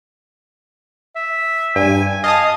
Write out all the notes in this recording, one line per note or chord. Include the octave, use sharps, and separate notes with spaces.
E5
G2 G#5
D#5 F5 A5 D#6